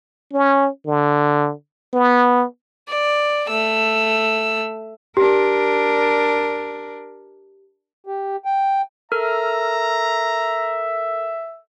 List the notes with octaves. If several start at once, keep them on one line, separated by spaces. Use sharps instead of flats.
C#4
D3
B3
D5
A3 E6
D4 G4 A#4
G4
G5
A4 A#4 E5 A#5 F6